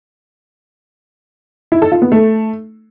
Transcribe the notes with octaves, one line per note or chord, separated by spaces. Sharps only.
E4
A4
F4
B3
A3